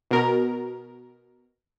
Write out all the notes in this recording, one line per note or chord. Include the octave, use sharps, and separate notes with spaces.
B2 A#4